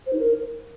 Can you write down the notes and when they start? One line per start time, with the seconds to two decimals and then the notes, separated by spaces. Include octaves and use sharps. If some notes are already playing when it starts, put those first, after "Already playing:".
0.06 C5
0.13 D#4
0.19 A#4